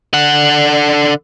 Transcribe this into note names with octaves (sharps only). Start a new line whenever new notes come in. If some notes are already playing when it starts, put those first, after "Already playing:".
D3 F#5